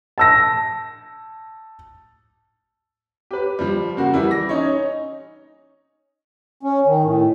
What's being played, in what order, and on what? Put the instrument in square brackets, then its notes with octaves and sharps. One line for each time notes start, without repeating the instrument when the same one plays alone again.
[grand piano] A5 E6 A#6
G4 B4
F3 G3
C#3 A#3 F#4
E3 G3 E4
A#6
C#4 D#4 C#5
[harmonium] C#4
D#3
A2